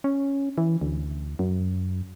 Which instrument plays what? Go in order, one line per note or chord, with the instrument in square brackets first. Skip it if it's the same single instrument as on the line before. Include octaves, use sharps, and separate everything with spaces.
[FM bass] C#4
E3
D2
F#2